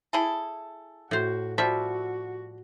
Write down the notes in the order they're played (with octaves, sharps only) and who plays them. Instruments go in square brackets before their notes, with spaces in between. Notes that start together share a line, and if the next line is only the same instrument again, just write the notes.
[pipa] E4 G#4 A4
[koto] A2 C5 [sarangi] F#4
[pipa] F3 G3 [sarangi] F#4 [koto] E5